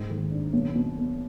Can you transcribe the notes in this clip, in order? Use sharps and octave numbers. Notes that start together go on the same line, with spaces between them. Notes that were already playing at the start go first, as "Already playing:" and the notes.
Already playing: G#2
D#3
D4
B1
B2
B3